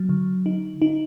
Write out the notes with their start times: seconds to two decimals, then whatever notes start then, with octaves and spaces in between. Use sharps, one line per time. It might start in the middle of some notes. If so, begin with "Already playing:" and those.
Already playing: F#3
0.09 D3
0.46 D#4
0.82 D#4